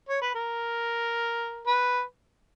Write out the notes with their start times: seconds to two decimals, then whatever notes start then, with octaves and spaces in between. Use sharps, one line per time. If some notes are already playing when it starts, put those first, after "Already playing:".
0.09 C#5
0.22 B4
0.35 A#4
1.67 B4